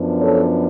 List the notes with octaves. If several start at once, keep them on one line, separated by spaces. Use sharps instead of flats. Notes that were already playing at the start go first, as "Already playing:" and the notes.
Already playing: F#2 F3 B3 D4
A4 C#5